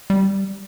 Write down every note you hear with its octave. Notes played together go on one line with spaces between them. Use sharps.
G3